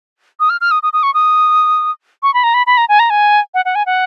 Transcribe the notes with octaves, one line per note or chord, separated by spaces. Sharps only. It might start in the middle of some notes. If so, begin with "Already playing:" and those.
D#6
F6
F6
D#6
D#6
D#6
C#6
D#6
C#6
B5
A#5
B5
B5
A#5
G#5
A#5
G#5
F#5
F#5
G#5
F#5